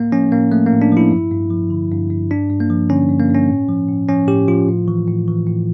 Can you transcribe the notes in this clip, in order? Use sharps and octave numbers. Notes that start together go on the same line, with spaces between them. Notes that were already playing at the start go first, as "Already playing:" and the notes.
Already playing: A2 A#3
F3 C#4
A2 A#3
F3 A3
A#3
A2
D4
F3 E4
G2
G2
F3
D3
G2
G2
G2 D4
G2
A#3
F3
D3 C#4
G2
A#3
G2 C#4
A2
F3
A2
F3 C#4
A2 G4
F3 F4
A2
E3
A2
E3
A2